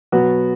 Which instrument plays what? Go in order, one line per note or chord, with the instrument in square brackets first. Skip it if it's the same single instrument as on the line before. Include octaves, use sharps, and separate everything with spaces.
[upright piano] B2 F#3 B3 F#4